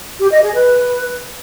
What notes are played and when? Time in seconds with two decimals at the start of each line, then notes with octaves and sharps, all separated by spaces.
0.20 G4
0.32 D#5
0.43 G#4
0.54 B4